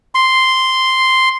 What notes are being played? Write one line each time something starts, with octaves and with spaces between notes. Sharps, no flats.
C6